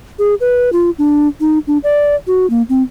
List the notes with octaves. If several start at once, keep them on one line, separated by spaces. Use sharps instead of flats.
G#4
B4
F4
D4
D#4
D4
D5
F#4
A#3
C4